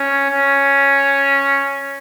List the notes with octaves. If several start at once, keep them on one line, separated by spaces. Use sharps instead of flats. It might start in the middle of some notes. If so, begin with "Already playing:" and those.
Already playing: C#4
C#4